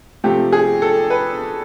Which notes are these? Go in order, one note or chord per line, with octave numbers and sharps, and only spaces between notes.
C3 F3 A3 C4 G4
G#4
A4
B4